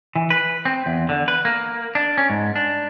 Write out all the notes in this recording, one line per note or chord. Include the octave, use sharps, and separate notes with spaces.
E3
B4
C4
E2
D3
B4
A#3
D4
C#4
G#2
D4